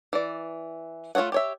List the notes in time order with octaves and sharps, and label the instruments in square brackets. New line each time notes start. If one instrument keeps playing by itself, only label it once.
[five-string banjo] E3 D5
A3 F4 A4 C#5 F#5
G4 C#5 E5